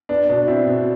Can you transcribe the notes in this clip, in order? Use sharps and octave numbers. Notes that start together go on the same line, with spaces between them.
B3 D4
B2 D4
C4 E4
B2